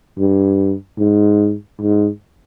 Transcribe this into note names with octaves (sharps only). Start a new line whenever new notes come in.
G2
G#2
G#2